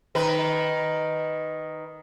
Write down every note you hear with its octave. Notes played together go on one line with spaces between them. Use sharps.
D#3 B4